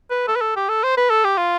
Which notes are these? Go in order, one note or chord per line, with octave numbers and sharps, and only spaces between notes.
B4
A4
B4
A4
G4
A4
C5
B4
A4
G4
F4